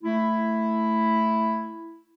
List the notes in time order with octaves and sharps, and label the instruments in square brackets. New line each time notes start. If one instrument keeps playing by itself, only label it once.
[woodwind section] A3 E4